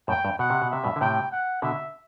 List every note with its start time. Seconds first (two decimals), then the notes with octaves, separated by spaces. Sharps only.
0.08 F#2 A2 G5
0.25 G2
0.39 B2 F#5
0.50 C3
0.62 B2
0.70 C3 E5
0.84 G2 B2
0.96 D3
1.01 A2 C3 G5
1.32 F#5
1.62 B2 D3 E5